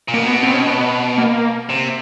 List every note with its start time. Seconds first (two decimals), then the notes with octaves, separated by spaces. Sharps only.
0.08 A#2
0.14 B2 A#3
0.27 B3
0.43 C4
0.54 C#4
0.67 B3
1.18 A#3
1.69 C3